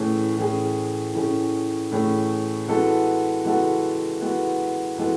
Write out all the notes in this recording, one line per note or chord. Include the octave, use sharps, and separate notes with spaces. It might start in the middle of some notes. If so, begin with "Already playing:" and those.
Already playing: A2 E3 A3 C#4 G#4
A2 E3 A3 C#4 G#4
A2 E3 A3 C#4 G#4
A2 E3 A3 C#4 G#4
E3 G#3 B3 F#4 A4
E3 G#3 B3 F#4 A4
E3 G#3 B3 F#4 A4
E3 G#3 B3 F#4 A4